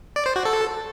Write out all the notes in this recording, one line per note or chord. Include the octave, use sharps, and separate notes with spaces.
D5
C5
F#4
A4